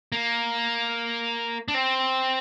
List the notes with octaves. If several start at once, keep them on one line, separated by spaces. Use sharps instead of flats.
A#3
D4
C4